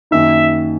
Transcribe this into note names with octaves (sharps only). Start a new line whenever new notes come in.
F#2 D#3 A#3 D#4 E5